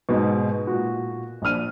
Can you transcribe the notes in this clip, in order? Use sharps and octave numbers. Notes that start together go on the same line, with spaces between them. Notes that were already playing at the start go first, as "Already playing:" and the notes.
G#2 B2
A#2 F#4
A#1 F3 D4 F6 D#7